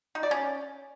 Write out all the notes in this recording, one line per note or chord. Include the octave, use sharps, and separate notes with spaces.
D#4
D5
C#4